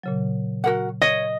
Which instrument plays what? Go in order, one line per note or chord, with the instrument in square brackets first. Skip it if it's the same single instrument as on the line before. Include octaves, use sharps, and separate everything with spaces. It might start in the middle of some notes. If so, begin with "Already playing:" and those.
[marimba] A#2 C#3 F#3
[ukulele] F#4 A#4 F#5
[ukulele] C#5 [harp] D#5